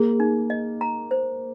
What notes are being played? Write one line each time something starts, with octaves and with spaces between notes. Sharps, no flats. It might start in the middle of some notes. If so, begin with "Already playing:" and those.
Already playing: A#3 G#4
D#4
D#5
A#5
C5